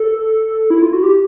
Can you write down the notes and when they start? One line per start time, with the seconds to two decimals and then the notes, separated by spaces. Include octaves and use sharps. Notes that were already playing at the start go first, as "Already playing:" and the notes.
Already playing: A4
0.70 E4
0.82 F4
0.93 F#4
1.03 G4